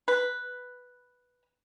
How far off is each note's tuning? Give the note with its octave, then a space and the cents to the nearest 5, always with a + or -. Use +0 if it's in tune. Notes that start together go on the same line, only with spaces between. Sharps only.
B4 +0